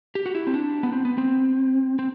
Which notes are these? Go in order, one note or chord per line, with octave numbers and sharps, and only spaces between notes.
G4
F#4
E4
C4
D4
B3
C4
B3
C4
C4